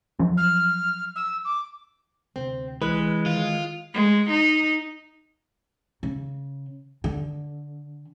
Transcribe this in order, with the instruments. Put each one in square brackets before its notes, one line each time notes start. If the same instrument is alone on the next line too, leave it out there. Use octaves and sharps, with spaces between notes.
[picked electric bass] F3 F#3 C#4
[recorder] F6
E6
D6
[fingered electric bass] D2 C3 [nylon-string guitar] C4
[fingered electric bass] C2 [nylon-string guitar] E3 B4 [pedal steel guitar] G#3
[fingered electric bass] D#3 [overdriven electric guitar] F4
[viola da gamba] G#3
D#4
[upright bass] C#3
D3